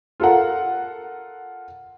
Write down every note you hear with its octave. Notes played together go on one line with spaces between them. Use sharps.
F4 A4 A#4 F#5